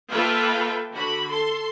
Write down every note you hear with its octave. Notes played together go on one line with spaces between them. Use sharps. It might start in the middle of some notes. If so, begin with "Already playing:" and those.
A#3 F4 A4 B4 E5 G5
D3 F#4 B5
A4 C6